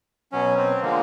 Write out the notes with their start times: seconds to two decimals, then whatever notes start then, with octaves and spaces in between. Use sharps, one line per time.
0.32 B2 F#3 C#4
0.57 C4
0.82 D3 F3 G#3 A#3